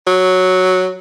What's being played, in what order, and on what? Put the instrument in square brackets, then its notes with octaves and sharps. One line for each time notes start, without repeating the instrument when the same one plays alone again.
[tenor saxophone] F#3